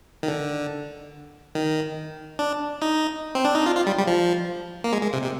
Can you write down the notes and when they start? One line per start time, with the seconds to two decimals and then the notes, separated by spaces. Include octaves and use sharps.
0.23 D#3
0.28 D3
1.55 D#3
2.39 D4
2.82 D#4
3.35 C4
3.45 D4
3.55 D#4
3.66 F4
3.77 F4
3.87 G3
3.98 G3
4.08 F3
4.84 A#3
4.92 G#3
5.03 G#3
5.13 C3
5.24 C3